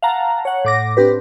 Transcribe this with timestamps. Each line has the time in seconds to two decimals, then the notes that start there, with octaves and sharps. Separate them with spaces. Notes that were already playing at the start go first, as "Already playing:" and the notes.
0.02 F5 F#5 A5 A#5
0.45 C#5 F#5
0.65 A2 D6 A#6
0.97 C4 D4 G4 B4